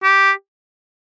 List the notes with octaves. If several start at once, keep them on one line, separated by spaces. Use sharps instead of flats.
G4